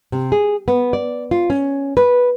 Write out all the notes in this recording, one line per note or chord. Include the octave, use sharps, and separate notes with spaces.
C3
G#4
B3
D5
F4
C#4
B4